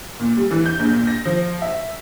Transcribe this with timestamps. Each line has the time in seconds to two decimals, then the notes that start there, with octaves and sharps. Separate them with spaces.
0.20 A#2
0.37 G3
0.51 E3
0.66 G6
0.79 A#1
0.93 A#2
1.07 A#6
1.25 F3
1.62 E5